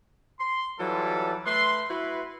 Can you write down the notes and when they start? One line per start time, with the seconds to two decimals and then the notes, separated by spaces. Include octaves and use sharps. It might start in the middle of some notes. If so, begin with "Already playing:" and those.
0.40 C6
0.79 E3 F#3 G3 F4 A4
1.46 A3 B4 C6
1.90 E4 F#4 B4